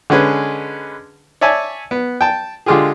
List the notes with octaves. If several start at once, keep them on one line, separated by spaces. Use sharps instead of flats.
D3 G#3 C#4 B4
C#5 D5 E5 G#5 A5
B3
G5 A5
D3 G#3 F4 G4 G#4